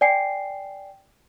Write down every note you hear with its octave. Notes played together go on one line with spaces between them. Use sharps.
D5 G5 G#5 C7